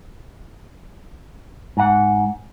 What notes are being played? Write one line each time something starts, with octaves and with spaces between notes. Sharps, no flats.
G#2 F#5